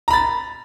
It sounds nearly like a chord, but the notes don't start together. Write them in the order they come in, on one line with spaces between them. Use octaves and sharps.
A#5 B5 A6